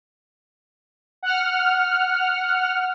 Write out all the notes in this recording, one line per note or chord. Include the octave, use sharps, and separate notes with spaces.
F#5 F6